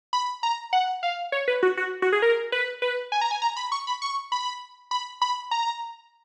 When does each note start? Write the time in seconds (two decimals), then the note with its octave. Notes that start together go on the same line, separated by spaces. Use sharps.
0.13 B5
0.43 A#5
0.73 F#5
1.03 F5
1.32 C#5
1.48 B4
1.63 F#4
1.77 F#4
2.02 F#4
2.12 G#4
2.22 A#4
2.52 B4
2.82 B4
3.12 G#5
3.21 A#5
3.31 G#5
3.42 A#5
3.56 B5
3.72 C#6
3.87 B5
4.02 C#6
4.32 B5
4.91 B5
5.22 B5
5.51 A#5